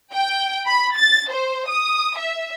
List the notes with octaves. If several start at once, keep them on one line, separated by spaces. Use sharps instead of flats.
G5
B5
A6
C5
D#6
E5